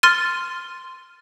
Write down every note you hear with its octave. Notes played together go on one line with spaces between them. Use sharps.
C6 F6 A6 D#7